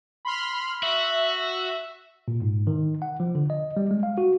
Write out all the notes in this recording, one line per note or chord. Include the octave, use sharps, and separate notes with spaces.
B5 C6 F6
F#4 E5
A#2
G#2
D#3
F#5
F3
D3
D#5
G3
G#3
F5
F#4